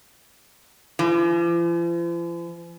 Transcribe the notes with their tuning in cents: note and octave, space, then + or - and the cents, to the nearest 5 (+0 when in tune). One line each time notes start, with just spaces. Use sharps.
F3 -45